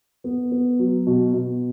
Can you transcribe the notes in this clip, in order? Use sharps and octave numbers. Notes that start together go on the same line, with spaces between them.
B3
B3
F#3
B2
B2